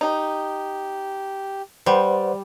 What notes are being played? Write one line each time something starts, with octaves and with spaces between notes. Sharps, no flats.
D#4 G4
G3 B4 C5 F#5